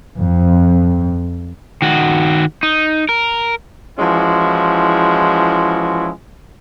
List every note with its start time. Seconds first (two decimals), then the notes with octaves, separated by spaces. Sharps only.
0.21 F2
1.82 D#3 F#4
2.63 D#4
3.09 A#4
3.99 E3 F3 G#3 C#4 E4 F#4